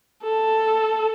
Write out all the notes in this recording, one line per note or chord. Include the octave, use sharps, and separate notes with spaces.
A4